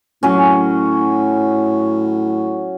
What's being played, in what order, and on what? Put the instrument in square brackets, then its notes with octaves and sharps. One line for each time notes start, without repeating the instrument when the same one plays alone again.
[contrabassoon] A2 [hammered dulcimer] F#3 C#4